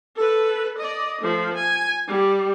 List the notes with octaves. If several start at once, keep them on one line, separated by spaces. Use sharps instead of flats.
A4 B4
D5 D#5
F3 A3
G#5
G3